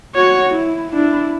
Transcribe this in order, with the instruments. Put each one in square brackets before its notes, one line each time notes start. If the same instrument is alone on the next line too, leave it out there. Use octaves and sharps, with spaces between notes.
[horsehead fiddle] F#4 [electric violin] C#5
[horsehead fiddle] E4
[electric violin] D4 [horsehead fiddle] E4